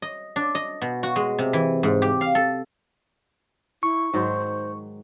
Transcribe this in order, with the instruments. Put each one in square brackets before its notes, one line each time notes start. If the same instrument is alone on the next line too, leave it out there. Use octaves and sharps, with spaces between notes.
[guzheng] D#5
D4
D#5
B2
F#4
G#3
C3
E3
G#2
G4
F5
A4
[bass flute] E4 [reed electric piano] C#6
[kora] G#2 D#3 F#3 [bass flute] C5